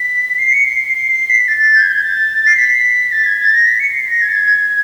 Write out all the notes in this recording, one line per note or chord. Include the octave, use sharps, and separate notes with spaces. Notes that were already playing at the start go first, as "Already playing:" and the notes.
Already playing: B6
C7
C#7
C7
C7
C7
B6
A6
G6
G#6
G6
A6
C7
B6
A6
G#6
A6
A#6
B6
C#7
C7
A#6
G#6
A6
G#6